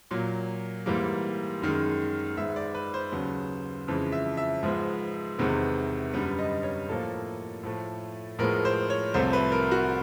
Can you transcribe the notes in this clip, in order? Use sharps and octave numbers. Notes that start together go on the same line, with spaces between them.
A#2 F#3 A#3
G#2 E3 G3 A#3
F#2 D#3 G#3
G#2 D#3 G#3 B3 E5
D5
B4
C5
D#2 C#3 F#3 B3
F2 C#3 E3 G#3
E5
E5
G#2 F3 G#3 B3
E2 C3 D#3 G#3 B3
F#2 D3 G3 B3
D#5
C#5
A2 F3 A#3 A4
A2 F3 A3
A2 F3 G#3 B3 A#4
C5
C#5
C2 C3 F3 A3 C5
B4
A#4
F#4